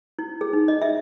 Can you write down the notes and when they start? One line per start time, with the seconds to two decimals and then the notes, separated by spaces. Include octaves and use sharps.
0.19 E4
0.41 G#4
0.53 D#4
0.68 D#5
0.82 E5